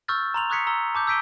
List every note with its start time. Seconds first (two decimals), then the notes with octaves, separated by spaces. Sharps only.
0.08 C#6 E6 F6 G6 A6
0.34 A#5 C6 F7
0.50 C#6 D#6 F#6 G#6 B6 C#7
0.67 A#5 E6 G7
0.95 A5 D6 G6
1.07 E6 G6 B6 D7 D#7 G7